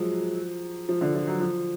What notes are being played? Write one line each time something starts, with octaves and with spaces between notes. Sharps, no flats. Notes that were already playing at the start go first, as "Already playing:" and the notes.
Already playing: F3 F#3 G#3
F3
D3
F3
F#3
F3